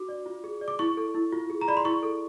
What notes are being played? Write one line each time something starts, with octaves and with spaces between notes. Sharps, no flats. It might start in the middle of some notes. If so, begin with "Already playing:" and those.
Already playing: D4 F#4 D6
D5
F4
G#4
D5
D6
E4 C#6
A4
E4
F4
G#4
A#5
D5 B5
C6
E4 C#6
A4